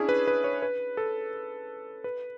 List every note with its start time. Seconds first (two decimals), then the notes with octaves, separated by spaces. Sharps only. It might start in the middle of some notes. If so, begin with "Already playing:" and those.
Already playing: C#4 D4 E4 G#4
0.09 B4
0.27 B4
0.44 C#5
0.62 B4
0.97 A4
2.04 B4